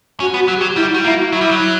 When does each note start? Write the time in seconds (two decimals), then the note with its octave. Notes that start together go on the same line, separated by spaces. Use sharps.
0.20 C#4 F#4
0.34 B3
0.38 F#4
0.48 F#3
0.57 G4
0.61 F#3
0.76 G3 E4
0.90 F#4
0.94 G3
1.04 A#3 E4
1.18 F#4
1.32 F#3 E4
1.41 G3
1.51 F#3